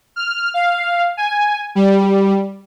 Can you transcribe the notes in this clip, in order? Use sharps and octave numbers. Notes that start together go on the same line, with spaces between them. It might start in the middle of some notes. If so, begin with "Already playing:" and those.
F6
F5
G#5
G3